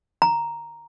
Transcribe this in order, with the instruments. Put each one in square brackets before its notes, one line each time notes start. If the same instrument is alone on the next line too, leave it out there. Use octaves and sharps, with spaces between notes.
[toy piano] A#5